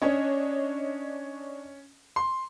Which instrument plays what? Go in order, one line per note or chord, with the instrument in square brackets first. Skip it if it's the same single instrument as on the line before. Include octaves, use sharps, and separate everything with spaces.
[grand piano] C#4 [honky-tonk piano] D4 C#5 D#5
[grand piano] C6